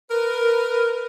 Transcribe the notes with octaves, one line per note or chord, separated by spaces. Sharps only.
A#4 B4